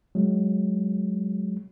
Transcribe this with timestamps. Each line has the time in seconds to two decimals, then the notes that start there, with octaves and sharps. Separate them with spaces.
0.15 F#3 G#3